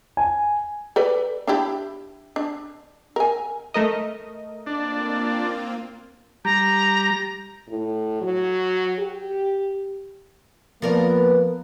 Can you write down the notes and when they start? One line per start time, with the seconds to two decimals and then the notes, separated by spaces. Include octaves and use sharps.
0.17 G#5
0.96 A4 B4 D5
1.47 D4 E4 G4
2.36 D4
3.16 A#4 G#5
3.74 A3 A#4 D#5
4.67 A#3 C4 D4 F4
6.45 G3 A#5
7.69 A2
8.22 F#3
8.99 G4
10.82 F3 A#3 B3 A#4 B4 D5